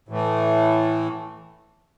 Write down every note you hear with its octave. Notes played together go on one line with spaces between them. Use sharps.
A2 E3 A3